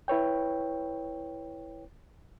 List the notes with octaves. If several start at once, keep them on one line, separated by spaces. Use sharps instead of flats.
E4 B4 C#5 G5